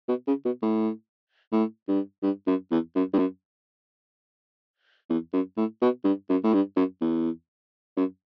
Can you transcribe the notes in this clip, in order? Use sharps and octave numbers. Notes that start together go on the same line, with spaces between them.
B2
C#3
B2
A2
A2
G2
G2
F#2
E2
F#2
G2
F#2
E2
F#2
A2
B2
G2
F#2
A2
G2
F#2
E2
F#2